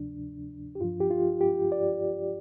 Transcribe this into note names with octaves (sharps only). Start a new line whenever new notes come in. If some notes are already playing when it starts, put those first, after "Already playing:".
Already playing: D2 C3 F3 D4
G4
G2 F3 F4
G4
F4
G4
D5